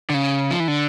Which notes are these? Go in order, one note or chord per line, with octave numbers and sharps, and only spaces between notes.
D3
C#3
F3
E3
D3